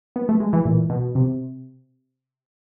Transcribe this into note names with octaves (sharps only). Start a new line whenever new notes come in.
B3
A3
G#3
E3
A#2
B2
C3